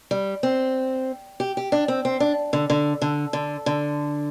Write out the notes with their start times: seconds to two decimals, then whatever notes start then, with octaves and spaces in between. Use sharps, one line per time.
0.11 G3
0.43 C4
1.40 G4
1.57 G4
1.72 D4
1.88 C4
2.05 C4
2.20 D4
2.53 D3
2.70 D3
3.02 D3
3.33 D3
3.66 D3